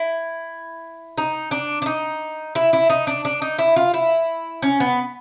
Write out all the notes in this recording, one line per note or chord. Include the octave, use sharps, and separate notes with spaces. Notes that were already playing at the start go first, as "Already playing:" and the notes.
Already playing: E4
D#4
D4
D4
D#4
E4
E4
D#4
D4
D4
D#4
E4
F4
E4
C#4
B3